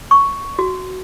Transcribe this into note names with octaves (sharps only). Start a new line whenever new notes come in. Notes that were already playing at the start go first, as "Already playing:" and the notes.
C#6
F#4